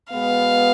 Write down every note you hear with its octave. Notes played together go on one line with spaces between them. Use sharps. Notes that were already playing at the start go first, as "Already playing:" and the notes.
B2 G#3 B3 F5